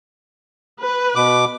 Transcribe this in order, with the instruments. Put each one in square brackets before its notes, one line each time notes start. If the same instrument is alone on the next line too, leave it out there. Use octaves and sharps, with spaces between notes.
[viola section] B4
[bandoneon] B2 D6